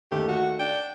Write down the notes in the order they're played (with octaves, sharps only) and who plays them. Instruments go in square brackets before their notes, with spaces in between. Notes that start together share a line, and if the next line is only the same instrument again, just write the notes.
[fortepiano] D#2 A3 [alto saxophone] G4
[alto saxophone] F#4
[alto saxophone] D4 [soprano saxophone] G5